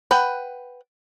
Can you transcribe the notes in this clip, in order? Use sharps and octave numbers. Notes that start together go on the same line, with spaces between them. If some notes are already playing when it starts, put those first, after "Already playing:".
B4 F#5 G5